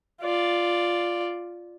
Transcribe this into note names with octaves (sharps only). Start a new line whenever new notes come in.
F4 D5